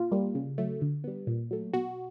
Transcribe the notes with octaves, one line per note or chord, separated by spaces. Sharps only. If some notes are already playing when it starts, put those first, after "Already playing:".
Already playing: A#2 F4
G3 A#3
C#3
F#3 A3
D3
G3 B3
A#2
F#3 A3
B2 F#4